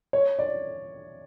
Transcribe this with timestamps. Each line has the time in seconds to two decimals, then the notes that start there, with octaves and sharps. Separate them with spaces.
0.13 C#5
0.39 D5